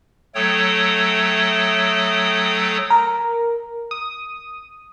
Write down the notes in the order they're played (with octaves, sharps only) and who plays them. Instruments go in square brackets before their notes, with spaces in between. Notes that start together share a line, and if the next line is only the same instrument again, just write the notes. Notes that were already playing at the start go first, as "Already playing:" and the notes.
[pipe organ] F#3 A3 A4 C#5 G5 D#6
[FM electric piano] A#4
D#6